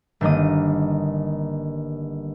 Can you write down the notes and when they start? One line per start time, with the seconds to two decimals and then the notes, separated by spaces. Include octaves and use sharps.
0.21 G1 D#3 A#3 D#6